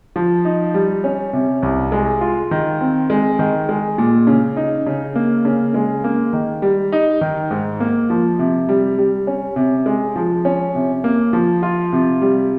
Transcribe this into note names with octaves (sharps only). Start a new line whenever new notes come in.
F3
D#4
G3
C#4
C3
C2
G#3
F4
D#3
C4
G#3
D#3
G#3
A#2
C#3
D#4
C#3
A#3
C#3
G#3
A#3
D#3
G3
D#4
D#3
G#2
A#3
F3
C3
G3
G3
C#4
C3
G#3
F3
C#4
C3
A#3
F3
F4
C3
G3